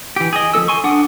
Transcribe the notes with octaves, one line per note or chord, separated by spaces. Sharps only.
E3 G4
G#4 D#5
F3 C#4 A4 E6
G#5 C6 C#6
D4 F#5 D6 D#6